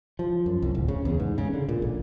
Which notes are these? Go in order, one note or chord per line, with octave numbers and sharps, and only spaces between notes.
F3
F#2
C2
D1
C#3
E2
G#2
C#3
D3
A#2
A#1